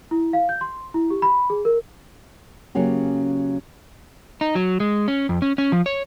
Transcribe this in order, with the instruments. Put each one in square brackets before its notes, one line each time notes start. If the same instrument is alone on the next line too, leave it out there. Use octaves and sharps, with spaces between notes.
[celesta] E4
F5
G6
C6
E4
G4
B5
G#4
A#4
[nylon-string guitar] C#3 F#3 A#3 C#4 G4
[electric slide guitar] D#4
F#3
G#3
C#4
F2
C#4
C#4
F3
C#5